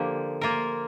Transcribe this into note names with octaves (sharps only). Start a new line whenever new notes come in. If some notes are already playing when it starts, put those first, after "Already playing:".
Already playing: D3 F3 A#3 D4 G4
A#3 F4 A#4